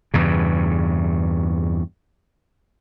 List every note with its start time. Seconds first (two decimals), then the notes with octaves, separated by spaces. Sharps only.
0.14 E2 G2 C#3